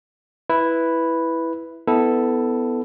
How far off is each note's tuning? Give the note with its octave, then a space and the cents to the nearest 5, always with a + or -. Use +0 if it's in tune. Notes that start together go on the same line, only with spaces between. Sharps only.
E4 +0 B4 +0
B3 +15 E4 -20 A4 +0